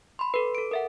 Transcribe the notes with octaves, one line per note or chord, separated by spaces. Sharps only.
B5 C6
A4 B4
A4 D7
A#4 E5 F#5